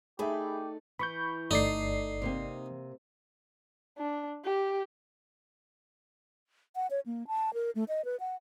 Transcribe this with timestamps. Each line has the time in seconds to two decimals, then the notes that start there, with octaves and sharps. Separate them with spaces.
0.19 A3 D#4 G4 G#4 D5 E5 B5
0.99 E3 B5 C#6 G6
1.51 G1 A3 D#4 D5 C7
2.22 C3 A#3 C4
3.98 D4
4.44 G4
6.76 F#5
6.91 C#5
7.06 A#3
7.27 A5
7.54 A#4
7.75 A3
7.88 D#5
8.05 B4
8.20 F#5